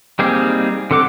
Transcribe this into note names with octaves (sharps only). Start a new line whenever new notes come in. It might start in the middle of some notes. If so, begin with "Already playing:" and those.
G3 A#3 C4 D#4 G#4
D3 C4 A4 F#5 D6